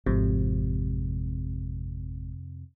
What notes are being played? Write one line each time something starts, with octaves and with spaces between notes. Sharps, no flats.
G#1 F2 C3